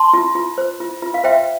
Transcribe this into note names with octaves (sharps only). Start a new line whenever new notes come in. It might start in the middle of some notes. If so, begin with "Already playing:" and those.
Already playing: A5 C6
F4
F4
C5
F4
F4
F5
C5 E5 G5